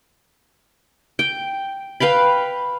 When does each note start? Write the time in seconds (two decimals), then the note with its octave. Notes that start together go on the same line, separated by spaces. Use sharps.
1.19 G5
2.00 B4 F5 G5 B5